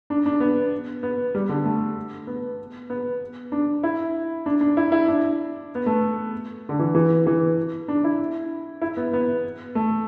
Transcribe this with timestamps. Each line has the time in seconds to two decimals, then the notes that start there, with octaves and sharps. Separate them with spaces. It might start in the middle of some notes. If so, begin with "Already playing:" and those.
0.10 D4
0.26 D4
0.40 B3
1.03 B3
1.35 G3
1.49 D3
1.65 A3
2.27 B3
2.90 B3
3.52 D4
3.83 E4
4.46 D4
4.61 D4
4.77 E4
4.92 E4
5.08 D4
5.75 B3
5.86 A3
6.69 D3
6.79 E3
6.95 E3
7.27 E3
7.88 D4
8.04 E4
8.82 E4
8.97 B3
9.13 B3
9.75 A3